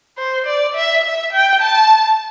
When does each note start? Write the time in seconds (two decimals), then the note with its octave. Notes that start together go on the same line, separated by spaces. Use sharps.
0.18 C5
0.46 D5
0.75 E5
1.04 E5
1.33 G5
1.62 A5